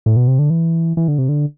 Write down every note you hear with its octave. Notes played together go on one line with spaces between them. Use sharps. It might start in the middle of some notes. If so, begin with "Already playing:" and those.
A2
B2
C3
D3
E3
E3
D3
C3
D3